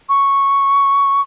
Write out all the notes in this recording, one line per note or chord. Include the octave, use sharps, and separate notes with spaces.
C#6